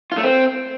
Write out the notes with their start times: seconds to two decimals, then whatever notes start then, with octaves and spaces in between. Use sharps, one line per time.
0.12 F4
0.17 A3
0.23 C4